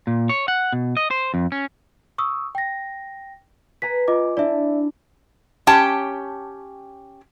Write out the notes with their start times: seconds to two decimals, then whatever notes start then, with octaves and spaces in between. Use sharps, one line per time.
0.07 A#2
0.29 C#5
0.48 F#5
0.72 B2
0.97 D#5
1.11 C5
1.34 F2
1.52 C#4
2.18 C#6 D#6 E6
2.55 G5 A#6
3.82 B4 G#5 A#5 B6
4.08 F4 D#5 D6
4.37 D4 E4 D5 E5
5.67 C#4 G4 G5 A5